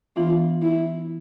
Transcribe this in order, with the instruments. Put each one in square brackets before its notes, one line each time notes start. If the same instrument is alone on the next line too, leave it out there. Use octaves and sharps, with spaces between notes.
[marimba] E3 B3 D4 [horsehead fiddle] F4
[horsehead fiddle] E4